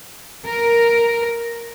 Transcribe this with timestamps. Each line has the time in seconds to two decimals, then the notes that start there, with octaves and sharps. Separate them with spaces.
0.45 A#4